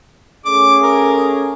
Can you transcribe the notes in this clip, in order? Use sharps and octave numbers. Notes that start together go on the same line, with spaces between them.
A3 C#4 G#4 D6
A#4